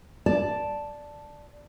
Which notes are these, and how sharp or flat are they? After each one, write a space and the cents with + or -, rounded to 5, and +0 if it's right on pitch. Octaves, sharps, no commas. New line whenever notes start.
D5 +0 A5 +0